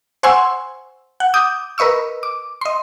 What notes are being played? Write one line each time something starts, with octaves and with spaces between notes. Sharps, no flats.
C5 F#5 G#5 C6 C#6 E6
F#5
D6 D#6 G6
A#4 B4 D#5 C#6 E6
D6
D#5 C6